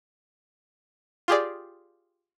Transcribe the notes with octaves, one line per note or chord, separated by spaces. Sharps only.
F4 G4 G#4 D5